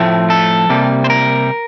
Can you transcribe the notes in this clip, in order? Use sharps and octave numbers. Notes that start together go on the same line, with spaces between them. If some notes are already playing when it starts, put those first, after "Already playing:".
Already playing: A2 F3 A3 C4
A4
C3 G3 A#3
C5
A#4